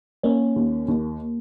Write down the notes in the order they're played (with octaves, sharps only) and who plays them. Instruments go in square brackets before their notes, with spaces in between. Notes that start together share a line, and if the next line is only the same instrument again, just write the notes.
[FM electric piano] A#3 [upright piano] C#4
[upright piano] D#2
D#2